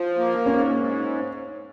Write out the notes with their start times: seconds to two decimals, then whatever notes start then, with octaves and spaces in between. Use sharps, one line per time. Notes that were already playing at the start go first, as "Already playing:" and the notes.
Already playing: F3 F4
0.18 A#3
0.46 G#2 C#4
0.75 G#2